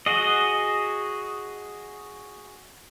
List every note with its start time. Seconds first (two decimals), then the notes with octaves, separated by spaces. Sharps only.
0.06 F#4 G#4 D#5